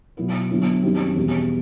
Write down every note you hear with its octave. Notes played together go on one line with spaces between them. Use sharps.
B2 F#3 B3 E4
D3 F#3 B3 E4
F#2 D#3 G3 C4
E2 B2 G3